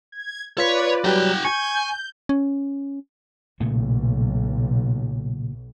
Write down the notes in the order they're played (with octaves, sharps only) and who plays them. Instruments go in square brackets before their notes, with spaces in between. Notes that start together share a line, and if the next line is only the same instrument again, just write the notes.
[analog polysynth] G#6
[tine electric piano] F4 B6 [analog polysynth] B4 D5 [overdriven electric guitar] C#5
[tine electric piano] F#3 G3 [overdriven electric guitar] F#4 G5
[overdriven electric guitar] G#5 [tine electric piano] C#6 [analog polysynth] G6
[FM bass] C#4
[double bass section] B1 [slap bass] A#2 C#3 A3